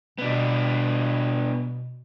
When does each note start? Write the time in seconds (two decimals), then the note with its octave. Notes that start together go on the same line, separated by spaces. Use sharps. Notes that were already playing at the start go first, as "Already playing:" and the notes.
0.18 B2 B3 D4